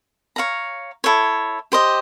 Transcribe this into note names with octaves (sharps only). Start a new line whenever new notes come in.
C#5 F5 A#5
E4 A4 C#5
G4 C5 D#5